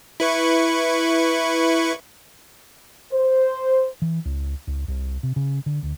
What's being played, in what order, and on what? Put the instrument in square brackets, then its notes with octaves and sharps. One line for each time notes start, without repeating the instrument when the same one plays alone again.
[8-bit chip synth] E4 B4 C#6
[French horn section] C5
[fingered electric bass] E3
C#2
C#2
C2
C3
C#3
D3
D2